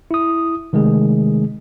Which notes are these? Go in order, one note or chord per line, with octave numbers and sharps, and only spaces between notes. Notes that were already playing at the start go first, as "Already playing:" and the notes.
E4 D#6
C3 D#3 G#3 A3 G#4